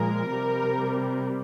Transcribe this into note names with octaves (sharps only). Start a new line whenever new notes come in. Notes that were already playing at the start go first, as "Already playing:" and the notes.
Already playing: A#2 F3 G#3 A#4
C3 G3